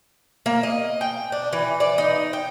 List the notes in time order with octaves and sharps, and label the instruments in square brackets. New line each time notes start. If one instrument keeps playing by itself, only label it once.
[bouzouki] A#3
D#5
G5
D4
E3
D5
D#4
G5